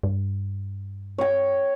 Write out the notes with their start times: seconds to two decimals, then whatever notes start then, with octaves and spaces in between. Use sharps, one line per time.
0.03 G2
1.18 C#5 G5